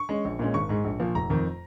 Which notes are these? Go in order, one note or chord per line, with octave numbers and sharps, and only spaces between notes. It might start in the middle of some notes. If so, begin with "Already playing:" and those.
Already playing: C#6
G#3 C#4
A#1
A#2 G#3 C#4
G#1 C#6
G#2 G#3
A#1
A#2 F3
F1 A#5
F2 D#3